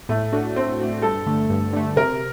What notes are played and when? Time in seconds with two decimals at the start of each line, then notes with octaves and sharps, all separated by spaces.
0.09 A2 A3
0.33 A3 D4 F#4
0.56 A2 C4
0.80 A3 D4 F#4
1.02 G2 A4
1.26 D3 A3
1.50 G2
1.73 D3 A3
1.96 C3 A#4